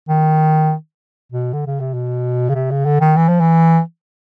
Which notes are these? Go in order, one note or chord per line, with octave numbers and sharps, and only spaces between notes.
D#3
B2
D3
C#3
C3
B2
C#3
C3
C#3
D3
D#3
E3
F3
E3